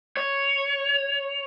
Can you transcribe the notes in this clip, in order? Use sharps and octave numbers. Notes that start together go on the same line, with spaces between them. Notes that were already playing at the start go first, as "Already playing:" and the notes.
C#5